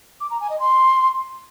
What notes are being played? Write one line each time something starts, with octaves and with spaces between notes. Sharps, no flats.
D6
A#5
G#5
D#5
C6